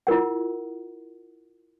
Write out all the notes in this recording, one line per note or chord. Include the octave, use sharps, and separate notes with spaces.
E4 F4 A#4 F#5